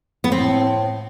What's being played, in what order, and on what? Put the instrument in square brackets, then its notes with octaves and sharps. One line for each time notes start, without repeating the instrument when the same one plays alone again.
[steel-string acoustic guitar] B3
[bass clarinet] A2 [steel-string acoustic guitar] C4